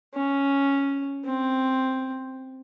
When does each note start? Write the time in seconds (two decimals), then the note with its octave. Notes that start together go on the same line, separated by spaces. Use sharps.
0.14 C#4
1.25 C4